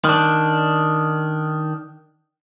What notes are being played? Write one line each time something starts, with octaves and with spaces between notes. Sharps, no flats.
D#3 D4